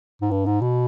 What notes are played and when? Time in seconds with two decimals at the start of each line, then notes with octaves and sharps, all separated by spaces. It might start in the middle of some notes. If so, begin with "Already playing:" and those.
0.22 G#2
0.31 G2
0.46 G#2
0.61 B2